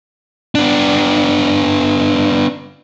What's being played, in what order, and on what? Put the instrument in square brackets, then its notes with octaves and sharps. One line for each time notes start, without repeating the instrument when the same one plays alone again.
[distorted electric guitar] B3 D4